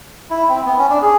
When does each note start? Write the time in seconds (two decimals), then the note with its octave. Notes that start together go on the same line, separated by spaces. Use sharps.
0.30 E4
0.49 C4
0.66 B3
0.78 C#4
0.90 D4
1.02 G#4